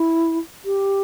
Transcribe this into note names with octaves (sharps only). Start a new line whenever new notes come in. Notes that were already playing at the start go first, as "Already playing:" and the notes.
Already playing: E4
G4